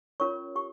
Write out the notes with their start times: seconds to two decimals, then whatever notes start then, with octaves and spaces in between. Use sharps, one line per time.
0.20 C#4 F4 A#4 C#5 C#6
0.56 G4 C#6